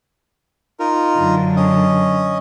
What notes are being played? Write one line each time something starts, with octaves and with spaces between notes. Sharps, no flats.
D#4 F4 A#4
F#2 D3
C#4 D#5